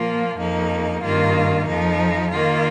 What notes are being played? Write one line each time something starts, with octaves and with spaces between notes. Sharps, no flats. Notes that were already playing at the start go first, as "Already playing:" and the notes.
Already playing: A#2 F3 A#3 F4
F2 F3 A#3 D#4
G2 D#3 A#3 F4
F2 F3 D#4
D#3 A#3 F4